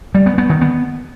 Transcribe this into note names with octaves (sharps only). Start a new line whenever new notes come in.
G3
B3
B3
D#3
B3